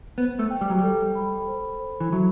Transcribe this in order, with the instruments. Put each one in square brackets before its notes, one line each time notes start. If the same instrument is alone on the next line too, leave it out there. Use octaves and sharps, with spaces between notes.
[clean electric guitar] B3 [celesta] C5
[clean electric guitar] A3
[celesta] G5
[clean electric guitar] G3
F#3
[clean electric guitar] G3 [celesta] A4
[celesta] B5
C5
C5
[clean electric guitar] E3
[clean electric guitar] F#3 [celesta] E5